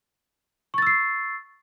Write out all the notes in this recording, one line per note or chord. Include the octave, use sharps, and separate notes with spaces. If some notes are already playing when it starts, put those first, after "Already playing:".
C#6 E6 A6 C7